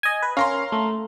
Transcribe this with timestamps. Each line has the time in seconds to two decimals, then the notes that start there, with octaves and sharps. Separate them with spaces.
0.03 D#5 G#5
0.22 B4
0.37 C#4 A#4 F5 A#5 C6
0.72 A3